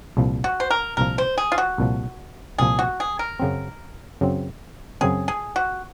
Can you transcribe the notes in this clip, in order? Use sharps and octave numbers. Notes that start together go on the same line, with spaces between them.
C2 A#2 F3
F#4
C5
A#4
C2 A#2 F3 A#4
C5
G#4
F4
F#4
C2 A#2 F3
C2 A#2 F3 G#4
F#4
G#4
A#4
F#2 C#3 F#3 C4
F#2 C#3 F#3 C4
F#2 C#3 F#3 C4 G#4
G#4
F#4